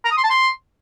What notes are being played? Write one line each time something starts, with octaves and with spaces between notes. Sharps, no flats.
A#5
D#6
C6
A5
C6